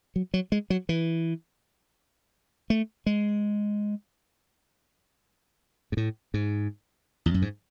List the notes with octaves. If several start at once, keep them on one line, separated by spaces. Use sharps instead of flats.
F#3
F#3
G#3
F#3
E3
A3
G#3
G#2
A2
G#2
E2
F#2
G#2